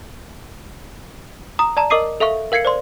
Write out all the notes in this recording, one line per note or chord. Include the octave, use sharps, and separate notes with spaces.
A#5 D#6
D5 A5 A#5
A#4 D#5 D6 D#6 C7 D#7
A4 E5 F5 C#6
A#4 F5 G#6 C7 C#7
C5 D5 C6